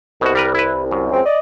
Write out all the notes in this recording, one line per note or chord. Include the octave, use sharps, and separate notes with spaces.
C2 B2 F#4
G3 A#4 B4
E4 B4
F#2
C#2 C4
D5 D#5